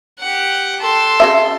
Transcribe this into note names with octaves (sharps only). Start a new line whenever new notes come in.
G4 F#5
A4 C6
C#3 F#4 E5